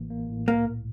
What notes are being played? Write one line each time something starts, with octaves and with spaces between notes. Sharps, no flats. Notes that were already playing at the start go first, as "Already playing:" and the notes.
Already playing: A1 A2 E3 A#3
A#3
A2
C2 A#3
A#2